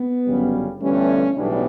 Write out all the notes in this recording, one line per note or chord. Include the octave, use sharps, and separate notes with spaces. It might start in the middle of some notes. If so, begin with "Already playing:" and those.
Already playing: B3
G1 F#2 C#3 G3
G1 G2 E3 G3 A3 C#4
B1 A2 E3 G3 B3 D4